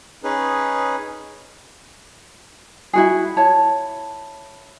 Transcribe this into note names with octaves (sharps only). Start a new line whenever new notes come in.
C#4 D#4 G#4 B4
E4 F#4 G#4
E4 C#5 A5